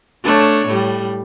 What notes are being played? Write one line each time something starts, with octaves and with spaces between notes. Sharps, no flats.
A3 D4 C#5
A2 G3